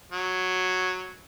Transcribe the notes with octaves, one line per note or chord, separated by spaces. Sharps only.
F#3